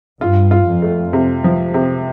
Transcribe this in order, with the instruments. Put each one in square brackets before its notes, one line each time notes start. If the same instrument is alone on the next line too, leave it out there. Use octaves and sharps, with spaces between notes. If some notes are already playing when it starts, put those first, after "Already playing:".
[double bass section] G2 [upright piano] F4
[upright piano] F4
[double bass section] F2
[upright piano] A3
C3
F3
C3